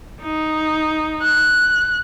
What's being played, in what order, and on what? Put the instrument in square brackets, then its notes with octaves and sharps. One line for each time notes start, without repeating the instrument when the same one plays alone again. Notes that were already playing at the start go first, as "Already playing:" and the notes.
[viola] D#4
[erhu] F#6